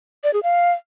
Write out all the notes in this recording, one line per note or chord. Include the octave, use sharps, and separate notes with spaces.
D5
G#4
F5